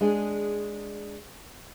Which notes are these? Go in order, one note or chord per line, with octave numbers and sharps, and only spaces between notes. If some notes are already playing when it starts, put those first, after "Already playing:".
G#3 D4 G#4